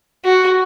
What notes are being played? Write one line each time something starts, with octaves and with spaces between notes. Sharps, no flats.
F#4